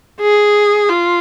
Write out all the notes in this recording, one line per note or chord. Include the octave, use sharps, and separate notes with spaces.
G#4
F4